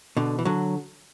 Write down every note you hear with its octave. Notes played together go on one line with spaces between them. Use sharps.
B2 D3
E3
D3 F#3